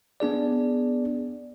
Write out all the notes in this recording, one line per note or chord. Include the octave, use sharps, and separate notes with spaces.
B3 D4 G#4 D5